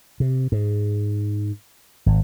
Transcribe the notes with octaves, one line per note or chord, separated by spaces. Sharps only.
C3
G#2
G#1